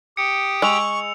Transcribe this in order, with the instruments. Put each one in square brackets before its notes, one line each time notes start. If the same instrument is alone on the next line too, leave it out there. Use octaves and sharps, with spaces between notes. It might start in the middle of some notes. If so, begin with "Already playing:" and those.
[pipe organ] G4 G5 D#6 [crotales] C#7
[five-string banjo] G#3 [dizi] C#6 [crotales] E6 F7